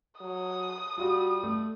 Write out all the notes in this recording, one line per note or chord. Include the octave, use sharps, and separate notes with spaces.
F#3 D#6
G3 F4 F#4
A3